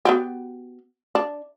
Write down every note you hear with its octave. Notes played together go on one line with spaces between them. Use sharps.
B3 F#4 G4
D4